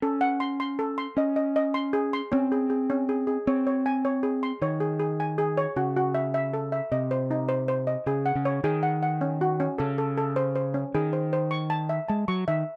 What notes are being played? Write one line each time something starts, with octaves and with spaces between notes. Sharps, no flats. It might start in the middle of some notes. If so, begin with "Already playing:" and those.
C#4 A4
F#5
C6
C6
A4
C6
C#4 D#5
D#5
D#5
C6
G#4
C6
C4 C#4
G#4
G#4
C#4
G#4
G#4
C4 C#5
C#5
G#5
C#5
G#4
C6
D#3 C#5
G#4
G#4
G#5
G#4
C#5
C#3 F#4
F#4
E5
E5
A4
E5
C3 D#5
C5
D#4
C5
C5
D#5
C#3 G#4
F#5
C#3
C#5
D#3 G#4
F#5
F#5
C#4
F#4
C#4
C#3 A4
A4
A4
C5
C5
C#4
D#3 G#4
C5
C5
C#6
A5
E5
G#3 A5
F#3 C#6
D#3 E5